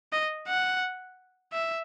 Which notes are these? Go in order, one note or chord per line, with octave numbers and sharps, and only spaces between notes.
D#5
F#5
E5